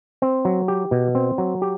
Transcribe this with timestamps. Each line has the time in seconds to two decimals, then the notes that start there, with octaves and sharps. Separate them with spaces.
0.22 C4
0.45 F#3
0.68 G4
0.91 B2
1.15 C4
1.38 F#3
1.62 G4